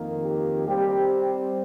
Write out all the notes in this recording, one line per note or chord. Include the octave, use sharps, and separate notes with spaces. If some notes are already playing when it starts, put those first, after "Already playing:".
Already playing: F2 D#3 A#3
G4
G3 C4 G4